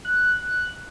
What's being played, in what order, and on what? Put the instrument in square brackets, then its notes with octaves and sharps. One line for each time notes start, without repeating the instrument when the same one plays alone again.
[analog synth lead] F#6